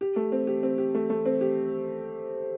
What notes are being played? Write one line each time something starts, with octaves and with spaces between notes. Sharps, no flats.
G4
A3
C4
G4
C4
G4
A3
A3
C4
G4